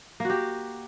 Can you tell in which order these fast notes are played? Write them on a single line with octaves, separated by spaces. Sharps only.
A#3 F#4 G4